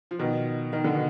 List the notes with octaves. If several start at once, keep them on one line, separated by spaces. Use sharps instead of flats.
F3
B2 D#3
D#3
D3
B2